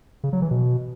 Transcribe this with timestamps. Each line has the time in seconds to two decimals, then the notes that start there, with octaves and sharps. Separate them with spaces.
0.24 C#3
0.33 F#3
0.42 E3
0.51 B2